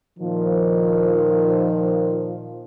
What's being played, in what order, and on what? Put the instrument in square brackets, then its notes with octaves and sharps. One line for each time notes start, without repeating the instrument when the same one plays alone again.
[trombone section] A#2 F3 [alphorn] D#3